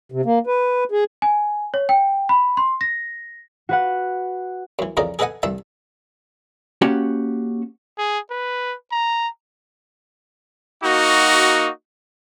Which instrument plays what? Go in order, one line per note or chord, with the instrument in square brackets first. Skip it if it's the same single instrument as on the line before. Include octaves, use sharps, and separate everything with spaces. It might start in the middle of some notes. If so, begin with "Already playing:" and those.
[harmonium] C3
A#3
B4
G#4
[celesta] G#5
C#5
G5
B5
C6
A#6
[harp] F#4 B4 F#5
[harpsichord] F#2 E3
F2 C#3 E3 A#4 D5 D#5
G#4 A4 B4 D#5 F#5 G#5
C2 G2 E5 A5
[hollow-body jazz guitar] A#3 C#4 F#4 G4 F#5
[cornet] G#4
B4
A#5
[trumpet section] A#3 D#4 F#4